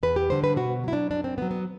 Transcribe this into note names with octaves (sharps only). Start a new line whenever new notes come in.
E2 B4
G4
D3 G3 C5
B4
B2 F#4
F#3 E4
D4
F#2 D4
C4
D3 B3
F#3
B3